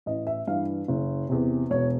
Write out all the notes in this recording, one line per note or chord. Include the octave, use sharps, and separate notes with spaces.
A1 D#5
E5
G2 E3 F5
F#1
E2 C3
E1 C#5